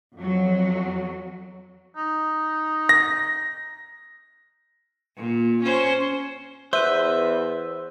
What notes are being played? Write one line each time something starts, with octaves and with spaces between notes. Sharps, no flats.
F2 F#3
D#4
A#6
A#2
C#4 C5
E2 B4 C5 E5